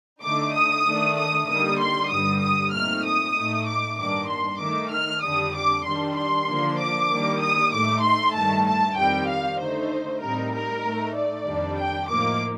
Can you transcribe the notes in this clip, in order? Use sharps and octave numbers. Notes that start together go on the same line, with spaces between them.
D3 A3 D#4 D6
D#6
D#3 A3 D4
D#6
D3 G3 A#3 D#4 D#6
C6
G2 D3 G3 D#6
D#6
A#2 A3 C4 D#4 F6
D#6
A2 A3 D#4
D6
G2 D#3 A#3 D4 D6
C6
D#3 A3 D#4 D6
F6
F2 D3 G3 D4 D#6
D6
D#3 G3 D4 C6
C6
D3 F3 A#3 D4
D6
D#3 G3 A#3 D4
D#6
A2 A3 D#4 D6
C6
G2 D#3 A3 A5
A5
F2 D#3 G3 C4 G5
F5
D3 A3 D#4 C5
A2 G3 C4 D#4 A#4
A#4
A2 A3 D#4
D5
F2 D#3 G3 D4
G5
A2 F3 A#3 D#4 D6